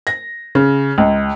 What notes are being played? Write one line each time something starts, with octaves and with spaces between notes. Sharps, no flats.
A#6
C#3
C#2